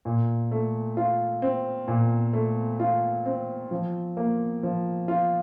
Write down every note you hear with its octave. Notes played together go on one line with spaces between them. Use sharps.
A#2
A3
F4
C4
A#2
A3
F4
C4
F3
A#3
F3
F4